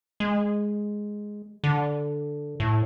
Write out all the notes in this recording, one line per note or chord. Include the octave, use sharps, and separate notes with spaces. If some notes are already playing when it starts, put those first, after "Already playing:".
G#3
D3
A2